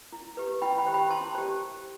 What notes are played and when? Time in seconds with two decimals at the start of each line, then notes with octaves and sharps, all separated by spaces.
0.12 E4
0.37 G4 B4
0.62 E4 G5 B5
0.78 G5 B5
0.86 G4 C5
0.94 G5 B5
1.10 E4 A5 C6
1.35 G4 C5